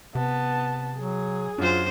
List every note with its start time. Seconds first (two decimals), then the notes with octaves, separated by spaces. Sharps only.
0.15 C3 B3 A5
0.97 F#3 G#4
1.58 F#2 D4 F4 C5